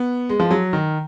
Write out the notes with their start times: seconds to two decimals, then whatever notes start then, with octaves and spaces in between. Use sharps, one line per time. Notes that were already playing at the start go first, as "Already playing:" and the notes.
Already playing: B3
0.29 G#3
0.40 F3
0.51 F#3
0.73 D#3